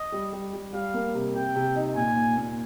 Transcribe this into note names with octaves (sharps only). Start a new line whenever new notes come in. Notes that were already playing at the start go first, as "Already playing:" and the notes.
Already playing: D#5
G3
G3
G3
G3 F5
A#3
C3
C3 G5
C3
D#4
A#2 G#5
A#2
A#2